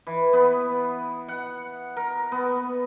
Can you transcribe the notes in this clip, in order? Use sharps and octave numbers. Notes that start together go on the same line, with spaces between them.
E3
B3
F#5
A#4
B3